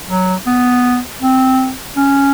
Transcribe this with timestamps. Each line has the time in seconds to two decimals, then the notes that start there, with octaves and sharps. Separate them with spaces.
0.09 F#3
0.46 B3
1.21 C4
1.96 C#4